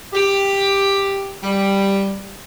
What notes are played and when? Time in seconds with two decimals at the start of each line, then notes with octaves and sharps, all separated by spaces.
0.14 G4
1.43 G3